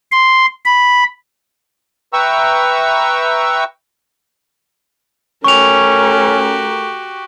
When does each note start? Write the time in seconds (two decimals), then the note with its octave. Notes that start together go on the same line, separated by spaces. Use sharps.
0.12 C6
0.66 B5
2.13 B4 E5 G5 A#5 C#6 E6
5.44 A3 C#4 F#4 G4 A#4 C#6 F7